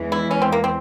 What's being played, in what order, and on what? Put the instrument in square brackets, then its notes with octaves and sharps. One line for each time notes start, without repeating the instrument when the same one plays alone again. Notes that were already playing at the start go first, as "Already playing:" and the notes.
Already playing: [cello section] E2 E3 G#3
[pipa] E4
C#4
C4
A#3
C4